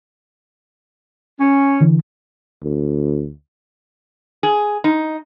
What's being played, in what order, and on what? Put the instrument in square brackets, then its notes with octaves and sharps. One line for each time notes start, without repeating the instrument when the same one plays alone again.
[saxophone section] C#4
[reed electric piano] D3 E3
[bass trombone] D2
[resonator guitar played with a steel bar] G#4
D#4